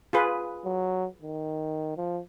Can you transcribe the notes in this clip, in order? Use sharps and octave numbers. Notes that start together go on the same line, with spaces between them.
F4 G#4 B4
F#3
D#3
F3